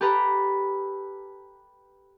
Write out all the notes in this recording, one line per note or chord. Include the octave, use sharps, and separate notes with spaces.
G4 A4 B4 A#5